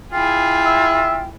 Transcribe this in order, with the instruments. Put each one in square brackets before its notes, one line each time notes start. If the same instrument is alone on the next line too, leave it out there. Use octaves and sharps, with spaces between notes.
[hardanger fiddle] E4 G#4 [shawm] F4 [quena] G5
[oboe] E5